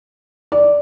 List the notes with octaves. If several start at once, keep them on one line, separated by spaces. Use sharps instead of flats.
D5